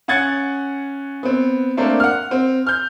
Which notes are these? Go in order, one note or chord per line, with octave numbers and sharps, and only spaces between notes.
C#4 F#5 F#6 G#6 A6 C#7
B3 C4
A3 A#3 C4 D4
F#5 F6
C4
F6 G6